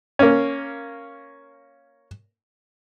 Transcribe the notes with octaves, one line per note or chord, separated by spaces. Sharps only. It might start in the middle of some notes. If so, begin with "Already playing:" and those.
A#3 C#4